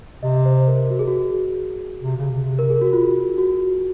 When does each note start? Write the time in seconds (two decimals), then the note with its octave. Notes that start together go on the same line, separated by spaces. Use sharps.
0.23 C3 D#5
0.45 C5
0.67 A#4
0.90 F#4
0.99 G#4
1.08 F#4
2.03 C3
2.17 C#3
2.31 C3
2.59 A#4
2.70 G#4
2.81 F#4
2.93 F4
3.38 F#4